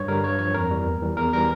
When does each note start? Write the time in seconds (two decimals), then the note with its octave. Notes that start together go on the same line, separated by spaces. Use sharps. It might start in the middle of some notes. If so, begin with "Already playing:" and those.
Already playing: G2 C#5
0.08 D3 G3 A#4
0.24 G2 C#5
0.39 F3 C#5
0.54 F2 A#4
0.71 E3 G3
0.86 E2
1.02 E3 G3
1.17 E2 A#4
1.33 E3 G3 A#4